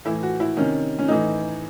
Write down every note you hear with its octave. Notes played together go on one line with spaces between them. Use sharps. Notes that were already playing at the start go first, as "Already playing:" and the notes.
A2 E3 E4
F#4
E4
C3 D#3 C#4
C#4
A2 E3 D#4